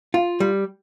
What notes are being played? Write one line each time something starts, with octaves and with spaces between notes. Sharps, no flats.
F4
G3